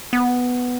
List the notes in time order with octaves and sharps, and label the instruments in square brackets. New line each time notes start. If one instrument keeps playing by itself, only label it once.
[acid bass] B3